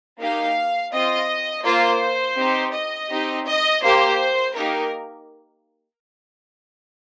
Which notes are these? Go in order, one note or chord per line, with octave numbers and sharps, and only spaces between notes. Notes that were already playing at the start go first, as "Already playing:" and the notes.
A#3 D#4 G4 F5
C4 F4 D#5
A#3 F4 C5
C4 D#4 G4
D#5
C4 D#4 G4
D#5
A#3 G4 C5
A#3 D#4 G4 A#4